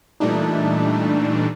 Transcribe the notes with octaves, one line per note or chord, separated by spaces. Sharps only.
A#2 E3 G3 A3 D4 D#4